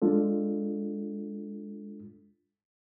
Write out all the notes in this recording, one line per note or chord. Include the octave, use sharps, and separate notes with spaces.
G#3 D4 F4 A4